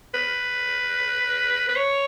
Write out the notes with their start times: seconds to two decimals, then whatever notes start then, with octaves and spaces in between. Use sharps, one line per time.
0.14 B4
1.69 B4
1.76 C#5